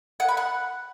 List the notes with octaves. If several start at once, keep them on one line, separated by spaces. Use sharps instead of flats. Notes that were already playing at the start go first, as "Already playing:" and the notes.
F#5
B5
F#5